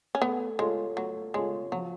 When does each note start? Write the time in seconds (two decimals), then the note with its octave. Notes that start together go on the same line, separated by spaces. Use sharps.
0.15 C#4
0.22 A3 B3
0.59 G#3 F4 A4 C#5
0.97 F#3 A3
1.34 G#3 F4 A4 C#5
1.72 F3 F#3